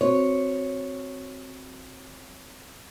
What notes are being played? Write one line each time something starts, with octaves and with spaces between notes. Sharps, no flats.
C4 F#4 C5 C#5